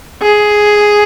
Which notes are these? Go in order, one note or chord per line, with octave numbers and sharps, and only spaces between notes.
G#4